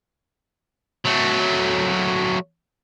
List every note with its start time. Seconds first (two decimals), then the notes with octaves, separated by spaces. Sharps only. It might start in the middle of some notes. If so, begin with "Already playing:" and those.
1.06 F#3 A3